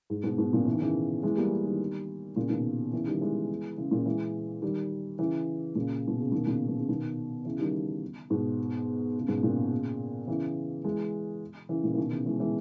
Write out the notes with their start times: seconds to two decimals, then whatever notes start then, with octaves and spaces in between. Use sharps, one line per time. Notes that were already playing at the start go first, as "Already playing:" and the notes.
0.10 G#2
0.24 G#2 B2
0.38 G#2 B2
0.53 A#2 C#3
0.66 E3
0.74 D#3
0.80 C#3 E3
1.23 E3 G#3
1.37 G3 A#3
1.66 D#3 G3
2.36 A#2 C#3
2.50 B2 D#3
2.93 C#3 E3
3.06 D#3 G3
3.21 E3 G#3
3.77 C#3 E3
3.91 A#2 C#3
4.06 E3 G#3
4.62 D#3 G3
5.18 C#3 E3
5.75 A#2 C#3
6.08 B2
6.20 C#3
6.32 B2 D#3
6.46 A#2 C#3
6.68 B2
6.79 C#3
6.88 B2 D#3
7.45 C#3 E3
7.59 D#3 G3
8.30 G#2 B2
9.19 C#3
9.28 G#2 B2
9.43 A#2 C#3
10.27 C#3 E3
10.84 E3 G#3
11.69 C#3 E3
11.84 A#2 C#3
11.94 E3
11.98 B2 D#3
12.11 C#3 E3
12.26 E3 G#3
12.40 E3 G#3